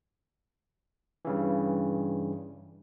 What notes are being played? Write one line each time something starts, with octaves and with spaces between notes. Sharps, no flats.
G2 C#3 E3